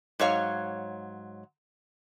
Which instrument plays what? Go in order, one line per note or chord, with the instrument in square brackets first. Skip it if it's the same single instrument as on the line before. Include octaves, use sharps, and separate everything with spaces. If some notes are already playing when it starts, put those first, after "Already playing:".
[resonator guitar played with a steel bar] G#2 F#3 C#5 F5